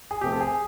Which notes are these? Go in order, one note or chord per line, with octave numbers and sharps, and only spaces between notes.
G#4
C3 F3 A3 C4 G4
A4
G#4